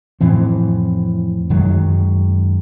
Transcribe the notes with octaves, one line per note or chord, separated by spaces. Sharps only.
F2 A2 E3 C4
F#2 D#3 F#3 G#3